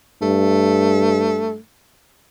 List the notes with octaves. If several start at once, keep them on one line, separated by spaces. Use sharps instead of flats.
G2 A3